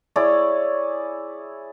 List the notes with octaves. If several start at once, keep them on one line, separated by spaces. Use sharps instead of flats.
E4 G#4 C#5 D5